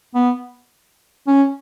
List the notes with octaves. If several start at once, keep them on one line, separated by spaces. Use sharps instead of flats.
B3
C#4